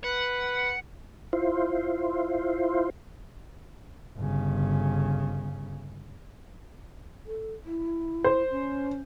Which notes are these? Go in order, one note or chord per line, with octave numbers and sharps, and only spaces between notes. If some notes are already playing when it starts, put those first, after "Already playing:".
B4 F#5
E4 F4 C5
G1 C#3
A4
E4
C5
C#4